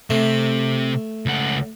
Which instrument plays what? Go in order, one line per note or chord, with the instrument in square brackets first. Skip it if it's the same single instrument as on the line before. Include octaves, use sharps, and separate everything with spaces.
[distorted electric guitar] C3 [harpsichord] A3
[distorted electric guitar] C#2 F#5